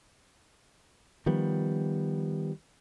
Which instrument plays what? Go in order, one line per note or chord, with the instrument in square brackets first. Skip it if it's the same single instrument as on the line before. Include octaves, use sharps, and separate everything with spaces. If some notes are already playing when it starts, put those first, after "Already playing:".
[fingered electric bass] D#3 F3 G3 B3